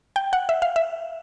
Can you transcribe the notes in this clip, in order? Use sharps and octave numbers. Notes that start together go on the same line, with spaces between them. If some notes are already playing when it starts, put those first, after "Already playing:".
G5
F#5
E5
F5
E5